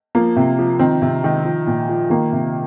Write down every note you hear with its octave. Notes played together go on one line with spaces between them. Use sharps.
F3 A#3
C3
F3
D#3 C4
C3
D#3
F3
A#2
F3
D#3 A#3
C3